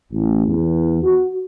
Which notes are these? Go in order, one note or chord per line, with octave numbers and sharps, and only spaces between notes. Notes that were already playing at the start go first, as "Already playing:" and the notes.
A1
E2
F#4